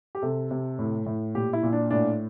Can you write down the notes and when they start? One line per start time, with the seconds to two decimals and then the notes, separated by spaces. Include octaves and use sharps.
0.15 G4
0.22 C3 A4
0.51 C3
0.79 A2
1.06 A2
1.35 A#2 G4
1.53 E4
1.63 A#2
1.73 D4
1.91 A2 D4